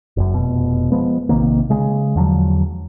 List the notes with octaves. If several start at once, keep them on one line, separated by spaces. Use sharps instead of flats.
F#1 F#2
F1 B2
F3 G#3 B3
A#1 C3 D#3 A#3
C#3 G#3
E2 D3 F3 F#3